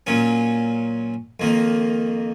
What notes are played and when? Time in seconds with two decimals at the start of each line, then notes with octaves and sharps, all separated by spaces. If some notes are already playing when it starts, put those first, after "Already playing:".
0.07 A#2 F#3 C#4
1.40 F2 D#3 A#3